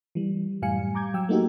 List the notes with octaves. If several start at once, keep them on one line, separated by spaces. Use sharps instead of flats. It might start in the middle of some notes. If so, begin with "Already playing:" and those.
E3 G3
F#2 A2 G3 F5 G#5 C#7
A#5 D6 G6 G#6
F#3 G5 E6
A3 A#3 D#4 F#4 G4